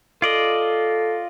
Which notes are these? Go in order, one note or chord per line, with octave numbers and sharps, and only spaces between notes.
F4 A4 D5 D#5